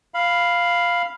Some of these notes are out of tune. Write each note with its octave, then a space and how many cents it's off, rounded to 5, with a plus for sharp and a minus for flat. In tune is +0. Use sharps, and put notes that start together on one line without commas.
F5 +0 B5 +0